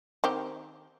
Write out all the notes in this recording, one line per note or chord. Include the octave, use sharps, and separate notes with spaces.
D#3 C4 G4